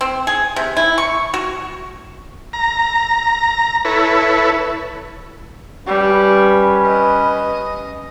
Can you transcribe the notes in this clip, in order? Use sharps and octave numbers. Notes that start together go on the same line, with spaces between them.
C4
G#4
C3
E4
C#6
F#4
A#5
E4 A4 B4 C#5
G3 C#4 B4
D#5